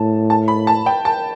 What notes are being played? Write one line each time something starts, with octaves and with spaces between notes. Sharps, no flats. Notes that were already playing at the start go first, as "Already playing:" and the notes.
Already playing: A2 A5
A5
B5
A5
G5
A5